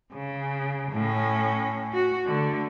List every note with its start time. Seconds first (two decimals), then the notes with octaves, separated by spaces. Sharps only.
0.14 C#3
0.92 A2 C#4
1.93 F#4
2.26 D3 A3